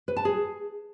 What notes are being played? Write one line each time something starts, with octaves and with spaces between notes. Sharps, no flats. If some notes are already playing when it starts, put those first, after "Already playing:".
B4
A5
G#4